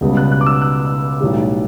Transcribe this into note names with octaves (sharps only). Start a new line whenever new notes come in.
C#2 B2 G3 B3
F#6
F#6
D6
E6
F#6
B1 A2 G3